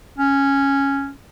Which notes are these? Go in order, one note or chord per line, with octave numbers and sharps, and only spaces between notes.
C#4